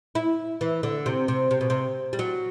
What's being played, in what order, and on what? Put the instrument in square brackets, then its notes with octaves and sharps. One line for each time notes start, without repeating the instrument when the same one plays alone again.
[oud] E4
E3
D3
C3
C3
C3
B2
C3
G3
F#3